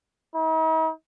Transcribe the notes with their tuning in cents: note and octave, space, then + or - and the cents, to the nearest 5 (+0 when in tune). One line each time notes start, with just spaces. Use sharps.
D#4 +45